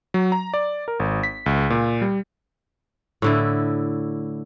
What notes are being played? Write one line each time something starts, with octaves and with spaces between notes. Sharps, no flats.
F#3
A#5
D5
A#4
G#1
B6
C#2
A#2
G3
A2 D3 E4